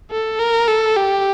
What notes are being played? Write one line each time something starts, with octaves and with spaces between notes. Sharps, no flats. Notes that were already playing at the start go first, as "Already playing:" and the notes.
A4
A#4
A4
G4